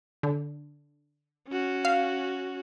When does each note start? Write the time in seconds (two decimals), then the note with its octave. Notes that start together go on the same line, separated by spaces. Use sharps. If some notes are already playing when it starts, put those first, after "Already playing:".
0.23 D3
1.48 C#4 F#4
1.85 F5